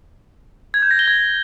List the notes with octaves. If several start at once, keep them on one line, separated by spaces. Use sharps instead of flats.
G#6
G6
A#6
G7
G#6